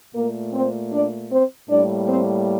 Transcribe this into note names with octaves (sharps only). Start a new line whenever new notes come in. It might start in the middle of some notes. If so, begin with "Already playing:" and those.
A#2 A3 A#3 A#4
C4 C5
D4 D5
C4 C5
A2 G3 A#3 D4 D5
C4 C5